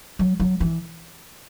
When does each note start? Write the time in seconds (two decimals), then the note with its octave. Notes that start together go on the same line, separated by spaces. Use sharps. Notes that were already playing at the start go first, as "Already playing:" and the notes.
0.19 F#3
0.40 F#3
0.60 E3